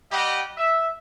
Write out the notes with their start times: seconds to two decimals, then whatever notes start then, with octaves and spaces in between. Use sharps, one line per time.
0.12 G3 G4 D#5 F#5 G5
0.57 E5